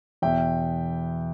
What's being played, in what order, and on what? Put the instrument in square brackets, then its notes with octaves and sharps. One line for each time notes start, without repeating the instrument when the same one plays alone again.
[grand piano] E2 B2 E5 G5